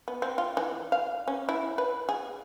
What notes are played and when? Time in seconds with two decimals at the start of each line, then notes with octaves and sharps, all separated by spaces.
0.08 B3
0.22 C4
0.38 F4
0.57 E3
0.92 F5
1.28 C#4
1.49 E4
1.78 B4
2.09 G#4